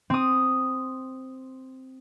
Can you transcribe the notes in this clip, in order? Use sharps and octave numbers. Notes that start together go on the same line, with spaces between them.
C4 D#6